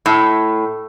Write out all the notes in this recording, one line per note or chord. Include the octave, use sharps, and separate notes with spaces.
A2